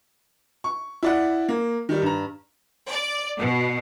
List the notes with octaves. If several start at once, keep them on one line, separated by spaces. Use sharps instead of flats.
C#6
E4 D5 F#5
A#3
D#3 G3
G2 A#5
D5
B2